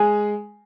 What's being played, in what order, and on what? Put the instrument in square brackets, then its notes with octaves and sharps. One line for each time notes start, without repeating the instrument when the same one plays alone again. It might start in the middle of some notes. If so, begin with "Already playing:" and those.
Already playing: [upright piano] G#3 G#4 [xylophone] G#5